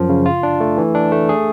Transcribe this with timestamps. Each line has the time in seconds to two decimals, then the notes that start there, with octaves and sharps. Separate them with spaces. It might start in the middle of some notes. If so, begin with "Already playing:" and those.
Already playing: F#2 F3
0.09 C#3
0.26 F4
0.43 D4
0.60 A3
0.77 E3
0.95 D4
1.12 A3
1.29 G#4